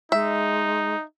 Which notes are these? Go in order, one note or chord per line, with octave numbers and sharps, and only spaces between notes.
G#3 D#4 E5